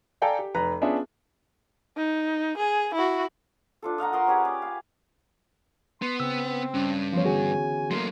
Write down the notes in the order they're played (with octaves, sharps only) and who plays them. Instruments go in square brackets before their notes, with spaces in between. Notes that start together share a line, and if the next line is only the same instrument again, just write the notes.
[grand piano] A4 D5 F5 G5 G#5 A#5
G4
F1 B4 A#5 B5
B3 C#4 D4 F4 G#4 E5
[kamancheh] D#4
G#4
E4 F#4
[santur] D4 F4 A4
D#5 F5 F#5 A#5
A#4 D#5 C6 C#6
C#4 G4 G#4 B4
D5
F5
[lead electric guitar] B3 [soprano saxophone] C6
[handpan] C#3 [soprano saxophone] C4 [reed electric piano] E6
[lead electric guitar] G2 [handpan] C#4
[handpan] E3 B3 C#5 [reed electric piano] F3 [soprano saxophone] F4
[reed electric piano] D3 F#4 G#4 [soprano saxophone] G#5
[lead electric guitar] F#3 A#3 [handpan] A3 [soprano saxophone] C6